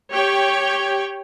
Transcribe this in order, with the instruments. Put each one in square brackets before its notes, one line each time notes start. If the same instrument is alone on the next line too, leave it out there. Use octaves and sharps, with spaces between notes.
[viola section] G4 C#5 G5